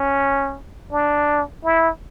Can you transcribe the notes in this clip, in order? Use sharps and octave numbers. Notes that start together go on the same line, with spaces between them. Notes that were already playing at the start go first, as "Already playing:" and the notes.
Already playing: C#4
D4
E4